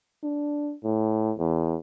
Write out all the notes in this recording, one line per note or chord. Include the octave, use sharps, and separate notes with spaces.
D4
A2
E2